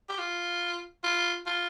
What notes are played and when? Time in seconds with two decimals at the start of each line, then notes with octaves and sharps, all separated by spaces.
0.09 G4
0.18 F4
1.04 F4
1.46 F4